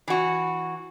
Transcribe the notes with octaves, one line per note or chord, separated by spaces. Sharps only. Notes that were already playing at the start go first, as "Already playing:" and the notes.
E3 F#4